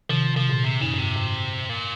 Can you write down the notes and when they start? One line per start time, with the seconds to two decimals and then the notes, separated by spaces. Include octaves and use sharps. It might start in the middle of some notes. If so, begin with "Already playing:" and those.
0.09 C3 D#3 F3
0.36 C3 F3
0.49 A#2
0.63 C3
0.81 F#2 C#3
0.94 G#2
0.99 F#2 C3
1.16 G#2
1.69 A#2